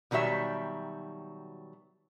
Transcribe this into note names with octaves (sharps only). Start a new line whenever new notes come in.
B2 D#3 F#3 G3 E5